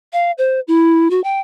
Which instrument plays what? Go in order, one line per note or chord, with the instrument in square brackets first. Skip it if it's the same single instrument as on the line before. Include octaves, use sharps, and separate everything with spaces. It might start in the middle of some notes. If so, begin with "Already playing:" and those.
[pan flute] F5
C5
E4
F#4
G5